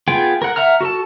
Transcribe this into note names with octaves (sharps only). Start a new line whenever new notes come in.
B3 F4 G#4 G5
A#4 F#5
E5 F#5 A#5 F6
F#4 A4 A5